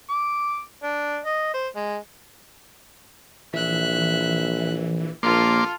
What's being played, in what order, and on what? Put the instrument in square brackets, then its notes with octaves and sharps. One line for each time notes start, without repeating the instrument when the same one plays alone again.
[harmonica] D6
D4
D#5
C5
G#3
[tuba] A#1 [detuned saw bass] E3 [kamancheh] E5 F#6
[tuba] A#1 [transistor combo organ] A#3 C6 D6 [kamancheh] F4 A4